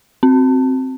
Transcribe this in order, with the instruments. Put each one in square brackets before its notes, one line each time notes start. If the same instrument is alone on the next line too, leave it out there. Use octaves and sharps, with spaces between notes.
[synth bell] C4